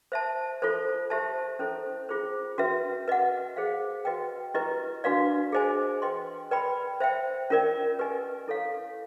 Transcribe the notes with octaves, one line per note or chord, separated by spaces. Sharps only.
C5 E5 A5
F4 A4 C5
G4 C5 E5 A5
C#4 E4 A4 C5
F4 G#4 C5
C#4 F#4 B4 E5
B4 D#5 F#5
G#4 C5 F5
F#4 B4 D#5 G5
E4 G4 B4 D#5
D4 F#4 B4 D5 F5
G#4 C5 D#5 G#5
B4 D#5 G5 C6
B4 D5 G5 B5
C5 E5 G5
C#4 F4 A#4 D5
G4 B4 D#5 G#5
E4 A4 C#5 F5